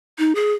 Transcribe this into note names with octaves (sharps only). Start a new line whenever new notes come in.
D#4
G#4